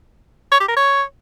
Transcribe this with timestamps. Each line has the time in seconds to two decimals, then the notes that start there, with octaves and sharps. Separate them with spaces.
0.52 C#5
0.60 G4
0.68 A#4
0.77 C#5